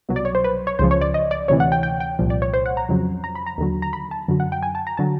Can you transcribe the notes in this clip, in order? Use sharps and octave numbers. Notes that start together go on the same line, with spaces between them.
C2 B2 F#3
D5
C#5
C5
B4
C#5
C#2 C#3 F3 C5
C#5
D5
D#5
D5
D2 C3 E3 C#5
F#5
G5
G5
G5
C2 A#2 F3
D5
C#5
C5
F#5
A#5
F2 C#3 F#3
A#5
B5
A#5
D#2 D3 F#3
A#5
B5
A5
F#2 D3 F#3
F#5
G5
G#5
A5
A#5
D3 F#3 A5